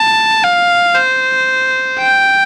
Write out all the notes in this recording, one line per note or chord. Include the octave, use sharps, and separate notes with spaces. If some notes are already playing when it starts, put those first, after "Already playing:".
Already playing: A5
F5
C5
G5